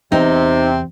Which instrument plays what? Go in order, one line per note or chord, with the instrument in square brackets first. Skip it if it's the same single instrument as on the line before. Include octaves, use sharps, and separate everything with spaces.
[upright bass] E2 [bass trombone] C3 [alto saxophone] C4 [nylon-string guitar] D#4